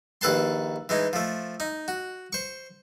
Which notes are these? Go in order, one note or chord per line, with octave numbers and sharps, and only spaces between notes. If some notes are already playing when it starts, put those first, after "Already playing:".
A#1 D#2 A4 B4 A5 C6
E3 G#3 D#4
F3 A3
D#4
F#4
C5 C#6